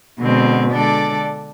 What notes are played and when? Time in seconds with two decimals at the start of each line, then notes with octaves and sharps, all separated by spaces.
0.20 B2 D3 G#3 C4
0.72 D3 G#3 D4 A4 D5